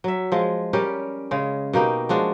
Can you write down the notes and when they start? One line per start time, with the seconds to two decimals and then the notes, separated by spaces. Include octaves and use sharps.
0.04 F#3 E5
0.32 F3 G#3
0.73 G3 C#4 G4 A#4
1.31 C#3 G#3
1.73 B2 A#3 D#4 G4
2.09 F3 G#3 D4 F#4